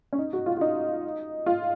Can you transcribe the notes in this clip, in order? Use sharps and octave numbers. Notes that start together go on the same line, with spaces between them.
C#4
D#4
F#4
F4
F4
D#4
F4